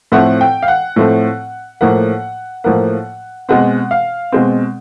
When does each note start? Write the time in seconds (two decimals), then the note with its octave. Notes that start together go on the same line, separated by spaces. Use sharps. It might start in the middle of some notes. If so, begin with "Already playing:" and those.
0.12 A2 F3 A3 C4 F#5
0.41 G5
0.63 F5
0.68 F#5
0.96 A2 F3 A3 C4
1.81 A2 F3 A#3 F#5
2.64 A2 F3 A#3 F#5
3.49 B2 G#3 C4 F#5
3.91 F5
4.32 B2 G#3 C4